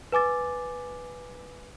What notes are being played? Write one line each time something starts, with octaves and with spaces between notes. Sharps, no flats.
B4 G#5 D6 A6